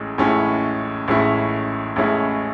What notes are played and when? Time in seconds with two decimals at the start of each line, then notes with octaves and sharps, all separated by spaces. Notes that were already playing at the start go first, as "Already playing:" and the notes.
Already playing: A1 A2 G#3 C#4
0.18 A1 A2 G#3 C#4 E4
1.08 A1 A2 G#3 C#4 E4
1.96 A1 A2 G#3 C#4 E4